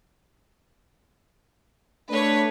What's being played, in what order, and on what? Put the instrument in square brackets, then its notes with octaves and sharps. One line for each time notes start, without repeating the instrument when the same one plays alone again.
[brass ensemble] A3 D4 [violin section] B4 C#5